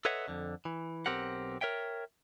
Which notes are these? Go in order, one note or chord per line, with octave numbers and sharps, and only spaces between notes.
A4 B4 C#5 D#5 E5 F#5
F2 D3
E3
B1 C4 G4 A#4 F#5
A#4 C#5 E5 G5